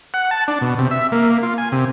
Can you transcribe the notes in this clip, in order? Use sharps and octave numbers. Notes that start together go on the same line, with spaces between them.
F#5
A5
D4
B2
C3
E5
A#3
F4
G#5
C3